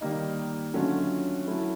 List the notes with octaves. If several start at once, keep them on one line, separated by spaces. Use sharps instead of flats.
D#3 G3 A#3 D#4
D3 F#3 A3 C#4 F4
F#3 A3 C#4 E4